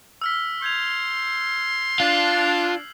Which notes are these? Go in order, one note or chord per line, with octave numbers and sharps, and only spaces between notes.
E6 F6 B6
C6 G6 G#6 F7
D4 F4 C7 F#7 G7